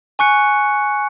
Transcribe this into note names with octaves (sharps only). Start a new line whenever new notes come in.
G#5 C#6 F#6 C#7